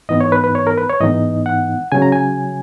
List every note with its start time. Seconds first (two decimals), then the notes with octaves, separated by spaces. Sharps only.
0.09 G#2 E3 B3 D#4 D#5
0.21 C#5
0.32 B4
0.44 B4
0.55 C#5
0.67 A#4
0.78 B4
0.89 C#5
1.00 G#2 E3 B3 D#4 D#5
1.46 F#5
1.92 C#3 F#3 C#4 G#5
2.02 A#5
2.12 G#5